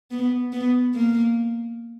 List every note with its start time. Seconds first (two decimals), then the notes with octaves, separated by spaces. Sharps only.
0.11 B3
0.53 B3
0.95 A#3